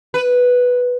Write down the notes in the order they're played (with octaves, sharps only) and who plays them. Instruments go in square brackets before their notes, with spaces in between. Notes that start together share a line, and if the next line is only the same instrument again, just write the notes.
[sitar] B4